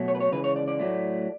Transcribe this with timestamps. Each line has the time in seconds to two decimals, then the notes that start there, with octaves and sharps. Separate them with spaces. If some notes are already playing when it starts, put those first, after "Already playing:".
Already playing: B2 F#3 A3
0.08 C#5
0.15 B4
0.20 C#5
0.32 C#3 E3 G#3 B4
0.44 C#5
0.56 D5
0.68 D5
0.80 A2 F#3 A3